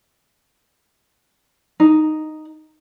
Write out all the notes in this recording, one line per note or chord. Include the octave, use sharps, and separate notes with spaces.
D#4